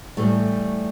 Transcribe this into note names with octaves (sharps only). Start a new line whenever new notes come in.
A2 E3 G3 A3